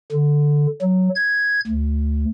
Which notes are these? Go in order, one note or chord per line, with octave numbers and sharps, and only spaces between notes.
D3
F#3
G#6
D2